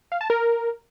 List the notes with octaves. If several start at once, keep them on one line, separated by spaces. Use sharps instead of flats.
F5
A5
A#4